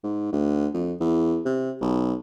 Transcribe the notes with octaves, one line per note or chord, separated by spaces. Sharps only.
G#2
D2
F2
E2
C3
B1